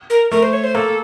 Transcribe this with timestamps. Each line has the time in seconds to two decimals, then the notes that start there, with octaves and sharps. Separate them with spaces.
0.10 A#4
0.31 A3 A#4
0.43 C5
0.53 C#5
0.64 C5
0.75 A#3 A4